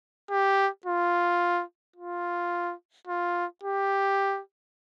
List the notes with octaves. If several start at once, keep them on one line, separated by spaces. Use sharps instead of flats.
G4
F4
F4
F4
G4